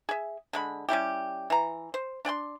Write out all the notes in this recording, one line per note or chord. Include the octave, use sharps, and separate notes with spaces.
G#4 E5
D3 G#3 B5
G3 C#4 E4 G4
E3 A#5
C5
D4 D5 G5 C6